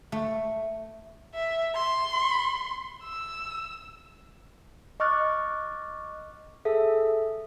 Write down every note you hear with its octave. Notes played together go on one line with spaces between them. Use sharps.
A3
E5
C6
E6
D#5 C#6 D6 F6 F#6 A6
G#4 A4 E5